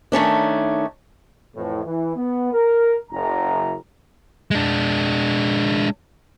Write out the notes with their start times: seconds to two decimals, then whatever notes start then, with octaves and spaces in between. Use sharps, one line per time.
0.12 D#3 A3 C#4 D4
1.55 F2 A2 E3
1.84 E3
2.16 B3
2.52 A#4
3.11 F#1 A#5
4.51 G#3 D4